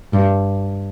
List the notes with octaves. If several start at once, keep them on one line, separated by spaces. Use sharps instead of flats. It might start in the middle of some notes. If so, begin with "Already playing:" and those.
G2